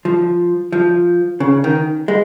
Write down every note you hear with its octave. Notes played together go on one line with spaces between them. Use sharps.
F3
F3
C#3
D#3
G#3